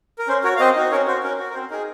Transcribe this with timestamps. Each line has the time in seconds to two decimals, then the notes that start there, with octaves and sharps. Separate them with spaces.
0.18 A#4
0.28 C#4 C5
0.44 F#4 A#4 C#5
0.56 F5
0.59 C4 C5 D#5
0.75 D#4 F#4
0.91 C#4 A#4 C#5
1.08 F#4 C5
1.23 C#4 A#4
1.39 F#4
1.50 A#4
1.54 C4 C5
1.70 D#4 G#4 A#4